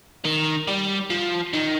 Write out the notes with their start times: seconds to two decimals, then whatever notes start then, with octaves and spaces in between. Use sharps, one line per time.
0.25 D#3
0.68 G3
1.10 F3
1.54 D#3